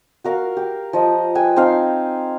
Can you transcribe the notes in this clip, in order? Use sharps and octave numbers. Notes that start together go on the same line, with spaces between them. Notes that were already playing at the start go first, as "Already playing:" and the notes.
F#4 A#4 F5
G4
F3 D#5
A4 B4 G5 G#5
C4 D#4 F5